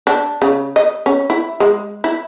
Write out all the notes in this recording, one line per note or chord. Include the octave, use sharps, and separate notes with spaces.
D4
C#3
D#5
C#4
E4
G#3
E4